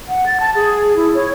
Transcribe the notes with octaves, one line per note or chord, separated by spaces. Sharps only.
F#5
A6
A5
G#4
E4
C#5